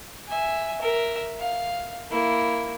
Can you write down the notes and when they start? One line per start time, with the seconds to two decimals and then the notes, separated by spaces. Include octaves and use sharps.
0.28 E5 G#5
0.81 A#4 E5
1.39 F5
2.11 A#3 E4